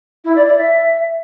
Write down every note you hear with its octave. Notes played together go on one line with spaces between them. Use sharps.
E4
D5
D5
E5